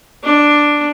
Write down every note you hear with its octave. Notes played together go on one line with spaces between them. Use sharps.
D4